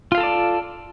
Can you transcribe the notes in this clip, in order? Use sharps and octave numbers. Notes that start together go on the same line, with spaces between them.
F4 A4 D5 F5 A5